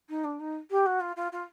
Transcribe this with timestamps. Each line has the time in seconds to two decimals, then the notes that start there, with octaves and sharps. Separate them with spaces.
0.09 D#4
0.24 D4
0.39 D#4
0.70 G4
0.86 F#4
1.00 F4
1.16 F4
1.32 F4